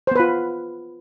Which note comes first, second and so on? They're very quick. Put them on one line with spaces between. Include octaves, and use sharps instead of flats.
C5 B3 B4 F4